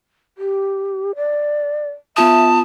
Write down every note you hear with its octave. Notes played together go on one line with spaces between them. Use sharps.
G4
D5
B3 F4 E5 A5 D#6